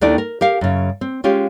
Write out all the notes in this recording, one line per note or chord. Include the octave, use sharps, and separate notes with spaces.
D#2 D#3 A3 D4 E4 D5
A#4
G4 A#4 F5
F#2 C#3
C4
G#3 C#4 F4 G4